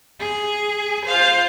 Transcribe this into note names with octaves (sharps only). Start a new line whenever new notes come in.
G#4
F4 C5 F5